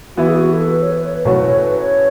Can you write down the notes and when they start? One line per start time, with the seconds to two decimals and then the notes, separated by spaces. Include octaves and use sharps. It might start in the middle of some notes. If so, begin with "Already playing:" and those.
0.17 E3 B3 E4 F#4
0.28 G#4
0.35 F#4
0.53 A4
0.71 B4
0.82 C#5
0.92 B4
1.04 C#5
1.14 B4
1.25 A2 F#3 A3 C#4 F#4 C#5
1.35 B4
1.46 C#5
1.58 B4
1.78 C#5